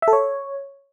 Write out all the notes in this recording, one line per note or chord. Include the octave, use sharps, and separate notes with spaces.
E5
A4
C#5